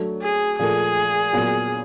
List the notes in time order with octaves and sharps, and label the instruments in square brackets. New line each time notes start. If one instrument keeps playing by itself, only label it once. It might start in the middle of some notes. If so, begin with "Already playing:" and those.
Already playing: [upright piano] F#3 A3 D4
[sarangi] G#4
[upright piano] A#2 F3 A3 [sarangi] G#4
[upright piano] A#2 F#3 B3